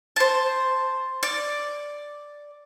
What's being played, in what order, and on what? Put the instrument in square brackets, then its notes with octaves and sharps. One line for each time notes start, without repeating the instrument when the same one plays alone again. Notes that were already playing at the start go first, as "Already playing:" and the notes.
[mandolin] C5 A5
D5